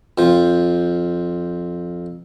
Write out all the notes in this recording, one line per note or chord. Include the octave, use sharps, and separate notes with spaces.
F2 F3